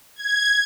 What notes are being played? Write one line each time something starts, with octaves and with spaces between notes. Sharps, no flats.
G#6